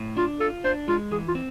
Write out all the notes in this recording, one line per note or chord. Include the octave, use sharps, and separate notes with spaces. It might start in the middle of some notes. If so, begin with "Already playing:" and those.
Already playing: A2
D4 F4
F4 A4
D4 C5
G#3 F4
E3 G#4
F4
C4